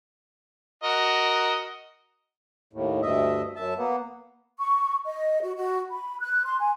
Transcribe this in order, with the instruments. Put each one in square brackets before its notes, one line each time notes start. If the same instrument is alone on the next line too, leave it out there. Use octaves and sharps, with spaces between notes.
[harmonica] F#4 A#4 D#5
[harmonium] D#2 A2
D2 G2 D#5 E5
F#2 E5 A5
A#3 B3
[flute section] C#6
D#5
F#4
F#4
B5
F#6
C6
G#5